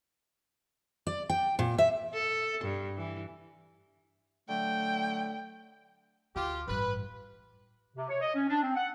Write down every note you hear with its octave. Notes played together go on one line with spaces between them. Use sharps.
D5
G5
A#2
E5
A4
G2
E3
D3 F#3 A3 G5
D2 F4 G4
A1 G2 B4
C3
C#5
D#5
C#4
D4
C4
F#5